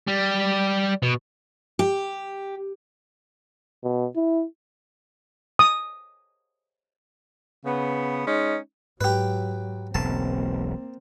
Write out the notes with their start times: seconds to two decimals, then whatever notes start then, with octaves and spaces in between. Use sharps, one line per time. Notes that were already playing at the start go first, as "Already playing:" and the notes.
0.07 G3
1.03 B2
1.79 G4
3.83 B2
4.16 E4
5.59 D#6
7.65 C#3 B3
8.26 G#3 C#4 D#4
9.01 G#2 F#3 G4 B4
9.95 E1 B1 A#3 C4 A5